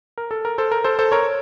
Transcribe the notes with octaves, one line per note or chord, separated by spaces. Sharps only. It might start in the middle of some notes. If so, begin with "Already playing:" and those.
A#4
A4
A#4
A4 C5
A#4
A4 C5
A4 C5
A#4 C#5